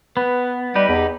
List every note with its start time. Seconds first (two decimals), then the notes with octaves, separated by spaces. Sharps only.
0.17 B3 B4
0.75 G3 D#4 G4 B4
0.89 E2